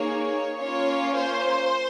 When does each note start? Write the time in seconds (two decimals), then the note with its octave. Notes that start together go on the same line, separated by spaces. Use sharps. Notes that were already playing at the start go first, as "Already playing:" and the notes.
Already playing: A#3 D#4 G#4 C#5
0.59 A#3 C#4 F4 C#5
1.14 C5